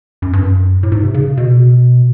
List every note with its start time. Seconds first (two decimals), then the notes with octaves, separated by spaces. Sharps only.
0.22 F#2
0.33 G2
0.44 F#2
0.83 A2
0.92 G#2
1.03 C3
1.14 C#3
1.38 B2